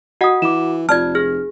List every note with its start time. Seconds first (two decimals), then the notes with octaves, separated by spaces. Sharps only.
0.21 F#4 D#5 F#5 D#6
0.42 E3 D6 E7
0.89 F1 F4 D5 A5 F6 G#6
1.15 G#4 F6